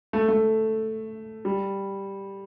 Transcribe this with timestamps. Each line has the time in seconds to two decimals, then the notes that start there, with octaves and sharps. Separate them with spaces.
0.13 A3
0.28 A3
1.45 G3